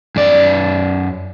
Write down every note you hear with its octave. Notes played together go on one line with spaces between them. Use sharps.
F#2 D5